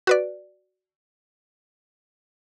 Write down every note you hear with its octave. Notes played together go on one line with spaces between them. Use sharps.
F#4 B4 D5